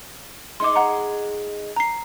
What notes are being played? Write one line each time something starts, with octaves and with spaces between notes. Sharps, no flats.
G#3 D#4 D#5 C6 D6
F#5 A#5
A#5 C7